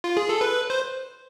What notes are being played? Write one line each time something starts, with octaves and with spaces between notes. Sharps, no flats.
F4
G#4
A4
B4
C5